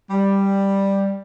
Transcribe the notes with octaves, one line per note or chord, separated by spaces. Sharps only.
G3